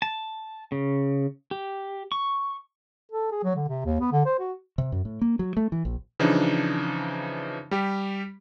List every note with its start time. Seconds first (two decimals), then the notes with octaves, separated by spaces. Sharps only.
0.02 A5
0.72 C#3
1.51 G4
2.12 C#6
3.12 A4
3.32 G#4
3.43 F#3
3.56 D3
3.69 C3
3.86 D#2
4.00 B3
4.12 D3
4.26 C5
4.39 F#4
4.78 C3
4.92 F#2
5.05 A2
5.21 A#3
5.39 F#3
5.57 A3
5.72 E3
5.85 A#1
6.19 C#3 E3 F3 D4 D#4
7.71 G3 G4